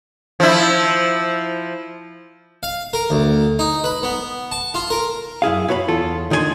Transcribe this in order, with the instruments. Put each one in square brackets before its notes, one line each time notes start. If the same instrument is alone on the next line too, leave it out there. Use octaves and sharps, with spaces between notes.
[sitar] F3 E4
[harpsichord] F5
A#4
D2
D#4
B4
B3
A5
F4
A#4
[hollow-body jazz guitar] F#2 E4 G#4 F5
E4 F#4 C#5 F5 B5
E2 F4 A4
D2 D#3 D4 D#4 G#5 C6